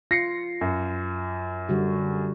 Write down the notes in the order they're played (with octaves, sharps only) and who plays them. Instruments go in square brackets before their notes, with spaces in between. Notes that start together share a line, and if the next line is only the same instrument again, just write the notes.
[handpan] F4 [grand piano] A#6 C7 C#7
[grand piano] F#2
[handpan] D3 G3 F#4